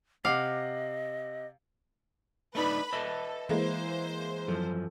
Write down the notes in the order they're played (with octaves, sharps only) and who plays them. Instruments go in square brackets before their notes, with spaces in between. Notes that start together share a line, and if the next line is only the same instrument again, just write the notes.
[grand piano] C3 F#5 D6 [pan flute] D#5 [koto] F5
[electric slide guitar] A3 D4 D#4 [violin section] B4 B5
[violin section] A4 [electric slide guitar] B4 D#5 E5
[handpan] E3 [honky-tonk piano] G#3 A#3 E4 [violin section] C5
[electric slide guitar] F#2 F3 [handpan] A4